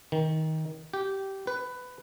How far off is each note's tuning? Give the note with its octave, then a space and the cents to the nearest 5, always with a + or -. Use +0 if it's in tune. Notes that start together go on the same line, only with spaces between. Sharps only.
D#3 +20
G4 -15
B4 +15